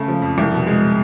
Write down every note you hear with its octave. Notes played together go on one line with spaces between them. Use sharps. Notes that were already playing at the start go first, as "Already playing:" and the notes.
Already playing: C#3 A3
F3
F2
C2
B2
G#3